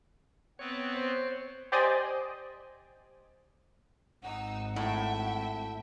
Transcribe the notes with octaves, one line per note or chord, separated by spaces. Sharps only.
B3 C4 B4 C#5
C5 C#5
G4 C5 D5 D#5 G5 G#5
G#1 D#4 F#5 E6
A2 E5 G5